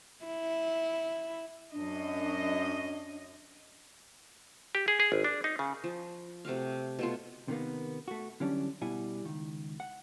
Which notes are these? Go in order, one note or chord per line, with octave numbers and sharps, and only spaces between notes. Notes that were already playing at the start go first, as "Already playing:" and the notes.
E4
F#2 D4 D#5
G4
G#4
G#4
G#1
D4
D#4
C#3
F3
C3 A3 F#4 F5
B2 A3 F4
C3 D#3 A#3 B3
A3 F#4
D3 E3 F#3 G3 C#4 D4
B2 G3 E4 F#5 G#5
C#2 D#3
F#5